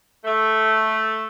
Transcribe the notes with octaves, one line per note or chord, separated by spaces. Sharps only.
A3